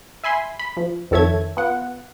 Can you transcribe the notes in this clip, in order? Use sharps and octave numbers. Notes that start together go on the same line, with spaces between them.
E5 G#5 B5 C6
B5
F3
F2 D#3 A4 C#5 E5 G#6
B3 F4 F#5